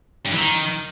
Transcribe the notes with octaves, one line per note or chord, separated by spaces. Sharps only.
G2
E3
D#3